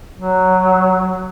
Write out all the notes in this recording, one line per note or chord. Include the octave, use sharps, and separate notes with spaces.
F#3